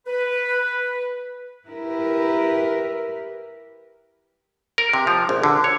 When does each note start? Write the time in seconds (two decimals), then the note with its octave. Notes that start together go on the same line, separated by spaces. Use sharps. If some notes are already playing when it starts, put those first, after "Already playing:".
0.07 B4
1.67 E4 G4 A#4 B4
4.78 A#4
4.93 C3
5.07 F3
5.29 A#1
5.43 D3
5.64 C#5